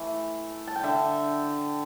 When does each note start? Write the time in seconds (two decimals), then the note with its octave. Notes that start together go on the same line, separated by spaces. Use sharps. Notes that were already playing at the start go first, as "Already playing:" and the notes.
Already playing: E3 A3
0.67 A5
0.76 G5
0.83 D3 E5